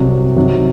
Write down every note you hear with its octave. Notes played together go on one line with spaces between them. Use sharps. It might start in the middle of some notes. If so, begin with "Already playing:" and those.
Already playing: C2 C3 F#3
C3 D#3 F#3